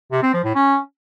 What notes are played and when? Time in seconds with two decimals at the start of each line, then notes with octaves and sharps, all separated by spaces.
0.12 C3
0.23 C4
0.34 F3
0.44 A2
0.55 C#4